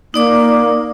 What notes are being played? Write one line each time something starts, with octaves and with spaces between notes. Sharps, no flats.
A#3 D#4 D5 D6